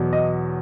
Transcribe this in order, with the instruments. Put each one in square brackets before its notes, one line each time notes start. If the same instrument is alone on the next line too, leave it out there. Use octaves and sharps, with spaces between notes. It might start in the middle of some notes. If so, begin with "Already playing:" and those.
Already playing: [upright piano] E2 B2 F#3
D#5